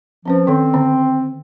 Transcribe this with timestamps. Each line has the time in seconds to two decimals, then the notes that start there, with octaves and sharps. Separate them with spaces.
0.25 F3 C4 C#4 B4
0.47 D#3 C4 A4
0.74 D3 B3